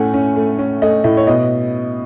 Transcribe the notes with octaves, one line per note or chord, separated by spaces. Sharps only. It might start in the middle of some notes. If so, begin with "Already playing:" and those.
Already playing: A2 A3 C#4 F#5 G#5
C#4
A3
C#4
A3 D#5
A2 D#5
C#5
B2 D#5